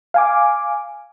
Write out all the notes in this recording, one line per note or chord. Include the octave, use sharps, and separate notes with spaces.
F5 G#5 D6